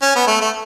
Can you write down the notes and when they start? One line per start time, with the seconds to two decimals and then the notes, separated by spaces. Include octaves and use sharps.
0.02 C#4
0.16 B3
0.27 A3
0.41 A3